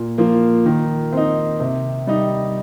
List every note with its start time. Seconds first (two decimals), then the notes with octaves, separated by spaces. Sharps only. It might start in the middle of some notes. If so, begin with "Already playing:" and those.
Already playing: A#2
0.18 F3 A#3 F4
0.65 D#3
1.12 C4 D#4
1.60 C3
2.07 G3 D#4